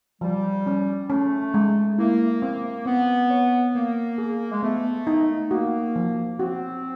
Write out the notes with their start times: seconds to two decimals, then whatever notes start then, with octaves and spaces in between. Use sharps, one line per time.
0.21 F3 G3
0.67 C#4
1.10 A3 C#4
1.54 G#3
1.98 A#3 E4
2.42 A#3 C4
2.86 B3 C4
3.30 C#5
3.75 A#3 B3
4.18 G#4
4.52 G#3
4.63 A3 B3
5.07 D#4
5.51 A#3 F#4
5.96 F3
6.39 C4 F#4